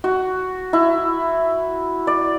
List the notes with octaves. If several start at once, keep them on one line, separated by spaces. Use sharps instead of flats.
F#4
E4
D5